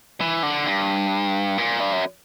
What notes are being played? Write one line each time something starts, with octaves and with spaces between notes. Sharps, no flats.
E3
D3
G2
A#2
G2
F#2